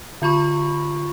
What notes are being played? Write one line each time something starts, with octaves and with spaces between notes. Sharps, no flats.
D3 F4 B5 C#6